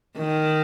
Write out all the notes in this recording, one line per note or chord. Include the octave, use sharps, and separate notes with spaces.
D#3